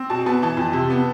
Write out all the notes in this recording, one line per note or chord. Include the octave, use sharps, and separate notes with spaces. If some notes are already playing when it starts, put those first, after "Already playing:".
Already playing: C4
B2 A5
B3 A5
E3 A5
F2
C3
B3